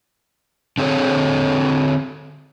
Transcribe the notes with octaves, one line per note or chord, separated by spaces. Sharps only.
D3 C4 G#4 A4 C#5